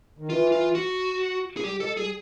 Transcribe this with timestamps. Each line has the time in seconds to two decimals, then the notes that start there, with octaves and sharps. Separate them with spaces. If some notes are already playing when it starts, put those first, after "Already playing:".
0.19 D#3
0.29 E3 F4
0.52 F4
0.75 F#4
1.57 G#4
1.64 G3 G4
1.80 G#3 A4
1.97 G3 G#4